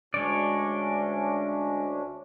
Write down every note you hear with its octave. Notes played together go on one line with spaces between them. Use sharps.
D2 G#3 C#4 D4 C#5 D5